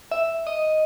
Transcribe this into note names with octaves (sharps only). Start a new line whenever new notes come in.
E5
D#5